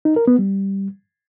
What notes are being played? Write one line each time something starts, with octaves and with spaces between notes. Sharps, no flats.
D#4
A#4
B3
G3